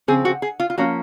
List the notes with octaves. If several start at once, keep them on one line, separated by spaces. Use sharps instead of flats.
C#3 F3 C4 G#4
F#4
G#4
F4
F4
F3 A#3 C#4 F#4